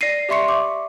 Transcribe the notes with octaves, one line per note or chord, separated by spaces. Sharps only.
D5 A#6 C7 D#7
G4 D5 E5 C6 C#6 C#7
D6